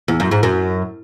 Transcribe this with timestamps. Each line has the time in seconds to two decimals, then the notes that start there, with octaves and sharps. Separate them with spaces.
0.08 E2
0.20 F#2
0.31 G#2
0.43 F#2